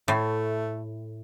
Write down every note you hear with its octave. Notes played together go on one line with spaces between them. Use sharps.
A2 A3